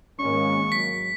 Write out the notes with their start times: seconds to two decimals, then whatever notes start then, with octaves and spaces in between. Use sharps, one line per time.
0.19 G#1 G#3 A#3 C#4 C#6
0.72 F#3 B6